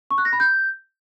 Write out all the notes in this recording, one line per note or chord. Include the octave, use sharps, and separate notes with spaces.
C#6
F#6
A#6
B5
G6